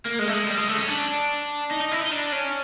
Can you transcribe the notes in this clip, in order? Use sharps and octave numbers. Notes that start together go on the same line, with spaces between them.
A#3
G#3
A3
G#3
G3
G#3
A3
C#4
D4
D#4
D#4
E4
D#4
D4
C#4